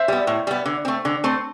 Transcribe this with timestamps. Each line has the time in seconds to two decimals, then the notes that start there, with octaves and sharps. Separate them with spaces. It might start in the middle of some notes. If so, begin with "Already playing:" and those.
Already playing: C5 E5
0.08 G3 B3
0.27 A2
0.47 G3 B3
0.66 D3
0.85 A3 C4
1.05 D3
1.24 A3 C4